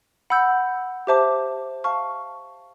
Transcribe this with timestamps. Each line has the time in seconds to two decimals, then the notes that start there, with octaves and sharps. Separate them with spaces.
0.30 F#5 B5 E6 G6
1.07 G4 C5 E5 A5 D6
1.84 F5 A5 C#6 F6